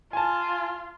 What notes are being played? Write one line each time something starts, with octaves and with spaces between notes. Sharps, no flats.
F4 G#5 A5